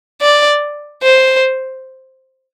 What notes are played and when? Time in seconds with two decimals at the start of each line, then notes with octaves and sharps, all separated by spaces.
0.22 D5
1.03 C5